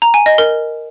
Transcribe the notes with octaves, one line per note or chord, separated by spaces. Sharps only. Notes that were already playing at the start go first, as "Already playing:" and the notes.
A#5
G#5
D#5
A#4